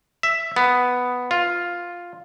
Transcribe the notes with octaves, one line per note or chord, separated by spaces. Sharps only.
E5
B3
F4